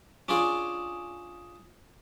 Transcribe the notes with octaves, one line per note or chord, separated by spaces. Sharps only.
C#4 D4 F4 G#4 D5